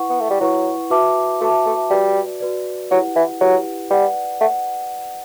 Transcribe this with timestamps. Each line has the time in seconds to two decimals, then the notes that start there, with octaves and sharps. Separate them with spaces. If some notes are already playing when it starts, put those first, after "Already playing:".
Already playing: E4 B4 F#5 C#6
0.10 B3
0.20 A3
0.30 G3
0.40 F#3 E4 B4 F#5 C#6
0.90 F#4 B4 E5 A5 D6
1.41 A3 F#4 B4 E5 A5 D6
1.66 A3
1.90 G3 F#4 B4 D5
2.40 F#4 B4 D5
2.91 F#3 E4 G4 B4 F#5
3.16 E3
3.41 F#3 E4 G4 B4 F#5
3.90 G3 B4 D5 F#5
4.40 A3 F#5